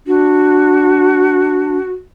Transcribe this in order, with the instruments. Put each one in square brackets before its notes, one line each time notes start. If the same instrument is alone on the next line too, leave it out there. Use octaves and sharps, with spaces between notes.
[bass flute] D4 [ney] F#4